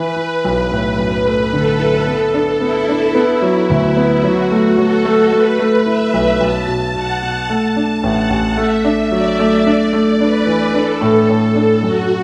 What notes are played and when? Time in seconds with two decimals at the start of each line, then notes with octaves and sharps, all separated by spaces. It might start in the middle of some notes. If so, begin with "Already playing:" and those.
Already playing: E3 E4 B4
0.16 E3
0.44 B1
0.72 A2
0.99 F#2
1.26 A3
1.53 D3 A4
1.79 E4
2.07 B3
2.34 D4
2.61 B3 E4
2.89 D4
3.15 B3
3.42 F#3
3.70 D2
3.97 B3
4.23 F#3 F#4
4.51 A3
4.78 F#3 A4
5.05 A3
5.32 A3 B4
5.59 A3
5.86 E4 E5
6.14 B1
6.40 B1 A5
6.67 B2
6.95 B2 F#5
7.22 B2
7.49 A3 A5
7.76 D4
8.03 A1 F#5
8.30 A1
8.57 A3 E5
8.85 D4
9.12 F#3 D5
9.39 A3
9.66 D4
9.93 A3
10.20 D4 B4
10.47 E3
10.74 D4 A4
11.01 A2
11.29 A2
11.55 D4
11.83 F#2 F#4